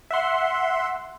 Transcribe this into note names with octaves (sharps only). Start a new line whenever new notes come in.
E5 F#5 C6